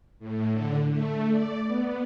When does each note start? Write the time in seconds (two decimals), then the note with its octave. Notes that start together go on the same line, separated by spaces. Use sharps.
0.19 A2
0.52 D3
0.91 A3
1.31 D5
1.67 B3